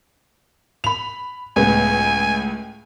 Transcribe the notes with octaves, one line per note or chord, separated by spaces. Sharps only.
B5 F7
C#2 A2 B3 G#5